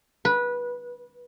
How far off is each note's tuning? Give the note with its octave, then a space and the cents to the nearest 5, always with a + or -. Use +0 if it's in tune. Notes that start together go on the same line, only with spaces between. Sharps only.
B4 -20